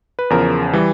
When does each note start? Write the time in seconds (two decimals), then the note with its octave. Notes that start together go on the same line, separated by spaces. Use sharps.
0.19 B4
0.30 E2 C#3 F3 A#4
0.73 E3 G3